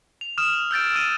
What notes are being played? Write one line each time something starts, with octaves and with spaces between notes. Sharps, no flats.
F7
D#6 F6 E7
E6 G6 A6 D7
E6 D#7